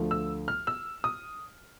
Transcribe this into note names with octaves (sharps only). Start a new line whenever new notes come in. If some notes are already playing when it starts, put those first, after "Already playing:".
Already playing: D2 D3 F3 A3
E6
F6
E6
D#6